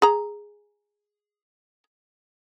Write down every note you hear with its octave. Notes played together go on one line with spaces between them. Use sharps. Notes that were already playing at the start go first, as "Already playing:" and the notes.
G#4 A#5